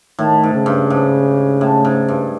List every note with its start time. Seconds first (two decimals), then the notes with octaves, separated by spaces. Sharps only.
0.19 A2 D#3
0.43 G#2
0.55 C#3
0.66 G2
0.90 G#2
1.61 A2
1.85 G#2
2.08 G2